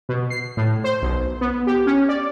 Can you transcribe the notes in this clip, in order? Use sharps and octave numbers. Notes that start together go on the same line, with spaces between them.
B2
C7
A2
C5
B1
B3
G4
C#4
D5